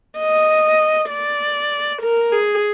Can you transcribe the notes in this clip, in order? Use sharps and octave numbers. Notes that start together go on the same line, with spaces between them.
D#5
D5
A#4
G#4